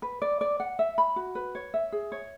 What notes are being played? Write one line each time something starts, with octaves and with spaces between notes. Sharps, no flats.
B4
D5
D5
F#5
E5
B5
F#4
B4
C#5
E5
G#4
C#5